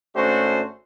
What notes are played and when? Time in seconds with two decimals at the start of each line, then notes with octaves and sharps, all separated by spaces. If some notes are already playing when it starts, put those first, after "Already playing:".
0.16 G#1 A3 C#4 D4 F#4 C5